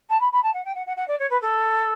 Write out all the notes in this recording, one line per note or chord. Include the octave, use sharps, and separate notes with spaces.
A5
B5
B5
A5
F#5
G5
F#5
F#5
F#5
D5
C#5
B4
A4